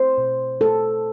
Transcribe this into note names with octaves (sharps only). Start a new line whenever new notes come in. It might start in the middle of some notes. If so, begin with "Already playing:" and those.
Already playing: A3 C5
B2
A3 A4